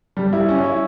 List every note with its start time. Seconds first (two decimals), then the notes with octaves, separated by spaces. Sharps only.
0.17 G3
0.33 E4
0.49 C#4
0.64 E4